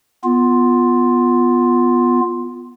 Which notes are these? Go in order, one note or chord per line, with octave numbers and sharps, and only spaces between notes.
B3 F4